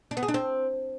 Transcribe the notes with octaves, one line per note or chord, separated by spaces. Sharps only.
D4
B3
G#4
D4
C4